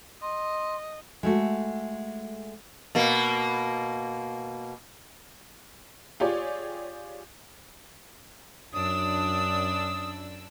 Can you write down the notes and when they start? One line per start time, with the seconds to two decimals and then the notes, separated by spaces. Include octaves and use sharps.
0.22 D#5 C6
1.23 G#3 A3 F#4
2.95 B2 A#3
6.20 F4 G4 G#4 C#5 D5
8.73 F#2 D4 D#6 E6